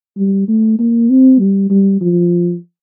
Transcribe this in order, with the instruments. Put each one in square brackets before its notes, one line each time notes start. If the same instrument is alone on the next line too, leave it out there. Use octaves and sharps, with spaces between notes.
[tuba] G3
A3
A#3
C4
G3
G3
F3